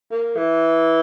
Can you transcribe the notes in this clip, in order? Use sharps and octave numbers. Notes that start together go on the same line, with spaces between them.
A#3
E3